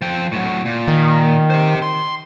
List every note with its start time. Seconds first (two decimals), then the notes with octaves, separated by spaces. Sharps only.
0.02 F3 G5
0.32 A2 F#3
0.65 A#2
0.88 D#3
1.50 G4 C5
1.82 C6